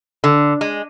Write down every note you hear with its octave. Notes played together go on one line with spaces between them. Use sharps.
D3
G#3